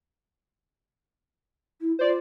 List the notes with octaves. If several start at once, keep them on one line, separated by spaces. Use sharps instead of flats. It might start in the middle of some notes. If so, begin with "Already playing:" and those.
E4
F4 C5 D5